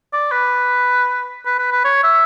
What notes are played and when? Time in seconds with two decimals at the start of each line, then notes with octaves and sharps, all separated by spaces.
0.13 D5
0.32 B4
1.46 B4
1.59 B4
1.72 B4
1.84 C#5
2.04 E5